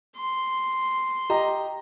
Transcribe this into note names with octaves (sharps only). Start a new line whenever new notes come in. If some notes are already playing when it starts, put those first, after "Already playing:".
C6
G4 D#5 A#5